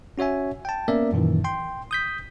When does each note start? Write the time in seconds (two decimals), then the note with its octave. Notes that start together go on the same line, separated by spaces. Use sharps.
0.18 C#4 F#4 C#5 E5 G#5
0.65 G5 A5
0.88 A#3 B3 C#4 A#4 D5 E5
1.13 F#2 A#2 D#3 E3
1.44 G5 C6
1.91 D#6 G6 B6